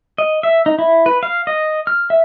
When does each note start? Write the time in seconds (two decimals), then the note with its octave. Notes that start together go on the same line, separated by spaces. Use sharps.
0.18 D#5
0.43 E5
0.66 D#4
0.79 E4
1.06 B4
1.23 F5
1.47 D#5
1.87 F6
2.10 E5